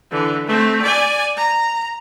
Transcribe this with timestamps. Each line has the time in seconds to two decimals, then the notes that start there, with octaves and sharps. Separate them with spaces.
0.11 D3 E3
0.47 A3 C4
0.82 D5 G#5
1.37 A#5